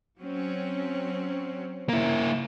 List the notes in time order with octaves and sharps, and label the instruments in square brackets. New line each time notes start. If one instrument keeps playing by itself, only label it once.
[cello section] F#3 C4 C#4
[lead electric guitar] A#3 E4